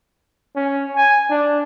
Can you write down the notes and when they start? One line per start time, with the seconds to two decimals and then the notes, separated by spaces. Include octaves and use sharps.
0.56 C#4
0.96 G#5
1.30 D4